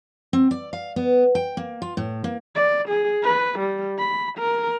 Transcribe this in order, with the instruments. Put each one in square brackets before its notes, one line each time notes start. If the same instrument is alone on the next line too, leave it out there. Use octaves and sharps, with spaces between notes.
[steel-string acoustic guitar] C4
D5
F5
B3
G5
A#3
F4
A2
A#3
[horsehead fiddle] D5
G#4
B4
G3
B5
A#4